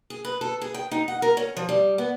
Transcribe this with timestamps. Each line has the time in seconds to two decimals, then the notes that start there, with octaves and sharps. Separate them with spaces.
0.10 G#4
0.25 B4
0.41 A4
0.61 G#4
0.74 G5
0.91 D#4
1.08 F#5
1.22 A#4
1.37 C#4
1.57 F3
1.69 G3
1.98 B3